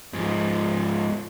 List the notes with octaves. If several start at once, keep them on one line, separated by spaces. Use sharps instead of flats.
G#2 F3